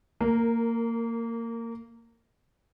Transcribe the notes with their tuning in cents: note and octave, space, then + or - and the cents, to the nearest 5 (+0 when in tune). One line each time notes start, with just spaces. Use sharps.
A#3 -20 A#4 +0